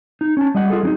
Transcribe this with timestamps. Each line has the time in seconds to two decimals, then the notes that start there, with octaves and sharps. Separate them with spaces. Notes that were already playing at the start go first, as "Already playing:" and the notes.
0.21 D#4
0.37 C#4 A5
0.55 G3 D#5 F#5
0.70 F4 G#4 A4
0.83 F#3 C#4 D#4